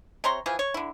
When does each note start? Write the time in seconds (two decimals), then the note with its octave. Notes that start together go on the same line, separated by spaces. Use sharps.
0.24 C3 C#5 A#5 C6
0.46 E3 F3 G#4
0.59 C#5
0.74 D3 E4